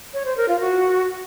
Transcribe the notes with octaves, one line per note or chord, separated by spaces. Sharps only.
C#5
C5
A#4
F4
F#4